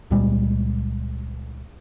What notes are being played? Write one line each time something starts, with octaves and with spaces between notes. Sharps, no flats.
C#2 A#2 G3 G#3